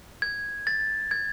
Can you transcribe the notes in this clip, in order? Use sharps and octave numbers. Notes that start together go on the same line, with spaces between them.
G#6
A6
G#6